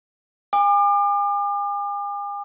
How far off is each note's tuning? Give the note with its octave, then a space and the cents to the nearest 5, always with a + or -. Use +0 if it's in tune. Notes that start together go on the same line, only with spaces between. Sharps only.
G#5 -40 D6 +40